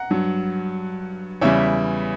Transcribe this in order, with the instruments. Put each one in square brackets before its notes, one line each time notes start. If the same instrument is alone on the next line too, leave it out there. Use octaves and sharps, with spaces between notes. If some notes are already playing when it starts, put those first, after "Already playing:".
Already playing: [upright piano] F#5 A#5
G2 F#3
E2 C#3 G3 C#5 E5